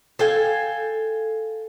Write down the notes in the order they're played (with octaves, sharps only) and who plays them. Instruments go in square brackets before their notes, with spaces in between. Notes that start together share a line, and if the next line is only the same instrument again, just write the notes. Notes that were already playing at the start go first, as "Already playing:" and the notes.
[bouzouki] A4 F5 G5 G#5